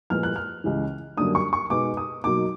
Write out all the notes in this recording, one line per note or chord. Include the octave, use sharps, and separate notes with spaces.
A#2 F3 G#3 B3 E4 F6
F#6
F6
C#2 C#3 E3
F#2 D3 G3 A#3 D4 D#6
C#6
C#6
B2 G#3 B3 D#4 D6
D#6
B2 F#3 A#3 D#4 D6